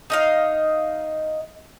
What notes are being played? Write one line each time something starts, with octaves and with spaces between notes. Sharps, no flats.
D#4 D#5 F5